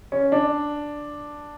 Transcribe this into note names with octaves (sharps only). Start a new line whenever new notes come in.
C#4
D4